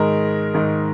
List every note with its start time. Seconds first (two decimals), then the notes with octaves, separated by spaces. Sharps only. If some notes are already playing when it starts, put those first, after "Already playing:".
Already playing: G#2 D#3 G#3 A#4
0.54 G#2 D#3 G#3